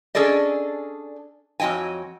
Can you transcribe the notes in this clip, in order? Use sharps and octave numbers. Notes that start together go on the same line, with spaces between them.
C#4 D4 G#4 A4 D5 D#5
F2 F#3 D#5 G5 G#5